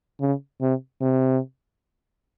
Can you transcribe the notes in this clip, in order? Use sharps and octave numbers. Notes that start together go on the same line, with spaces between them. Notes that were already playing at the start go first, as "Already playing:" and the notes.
C#3
C3
C3